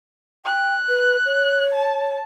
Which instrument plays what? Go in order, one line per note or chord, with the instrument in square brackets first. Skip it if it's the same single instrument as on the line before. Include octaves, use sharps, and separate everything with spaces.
[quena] G5 [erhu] F#6
[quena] B4
C#5
[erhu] A5